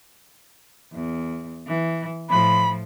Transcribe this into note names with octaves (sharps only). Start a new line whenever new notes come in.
E2
E3
A2 F3 B5